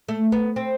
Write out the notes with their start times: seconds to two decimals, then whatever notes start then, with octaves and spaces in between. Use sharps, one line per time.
0.08 A3
0.32 B3
0.56 C4